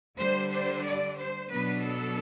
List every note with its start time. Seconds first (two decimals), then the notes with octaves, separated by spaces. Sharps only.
0.18 D3 G3 D4 C5
0.51 C5
0.85 D5
1.17 C5
1.51 B2 F#3 B3 D4 B4
1.83 A4